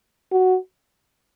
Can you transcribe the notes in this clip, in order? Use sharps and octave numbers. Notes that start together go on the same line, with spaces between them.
F#4